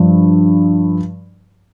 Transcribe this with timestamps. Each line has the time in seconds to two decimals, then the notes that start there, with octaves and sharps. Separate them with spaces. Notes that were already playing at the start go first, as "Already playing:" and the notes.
Already playing: G2 F3